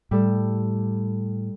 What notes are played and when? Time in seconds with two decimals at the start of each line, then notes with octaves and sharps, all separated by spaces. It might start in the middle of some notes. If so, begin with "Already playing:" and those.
0.11 A2 G3 A4